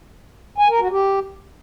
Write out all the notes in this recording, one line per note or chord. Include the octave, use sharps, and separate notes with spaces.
G#5
A#4
F#4
G4